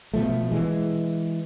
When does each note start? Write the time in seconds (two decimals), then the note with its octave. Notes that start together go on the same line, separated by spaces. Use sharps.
0.14 B2 F3 A3
0.51 E3 G#3